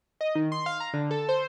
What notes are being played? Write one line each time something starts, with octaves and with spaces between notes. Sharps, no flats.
D#5
D#3
C6
F5
A#5
D3
A4
C5